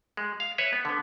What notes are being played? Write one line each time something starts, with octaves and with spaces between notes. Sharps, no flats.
G#3
F5
B4 C#5 E5
B3
D3 B3